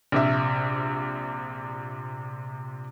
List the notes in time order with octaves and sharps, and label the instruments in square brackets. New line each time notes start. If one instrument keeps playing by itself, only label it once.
[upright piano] A#1 C3 E5